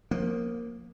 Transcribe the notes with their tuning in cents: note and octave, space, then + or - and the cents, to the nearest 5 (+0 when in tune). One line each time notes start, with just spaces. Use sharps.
F3 +25 A#3 +0